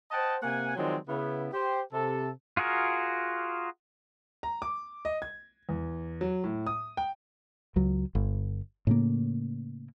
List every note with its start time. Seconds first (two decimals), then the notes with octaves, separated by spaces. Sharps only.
0.11 C5 D#5 F#5 G5 A5
0.43 C3 A#3 F#5 G#5
0.76 D#3 F3 F#3 G#3 C4 D5
1.08 C#3 B3 E4
1.53 G4 C5
1.93 C3 A4
2.57 F4 F#4 G#4 A#4
4.43 A#5
4.62 D6
5.05 D#5
5.22 G#6
5.69 E2
6.21 F#3
6.44 A2
6.67 D#6
6.97 G5
7.76 C#2 F#3
8.15 G1
8.87 A2 C#3 A#3